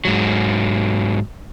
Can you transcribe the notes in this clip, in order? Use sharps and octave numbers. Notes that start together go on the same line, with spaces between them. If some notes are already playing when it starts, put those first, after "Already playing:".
G#2 F#3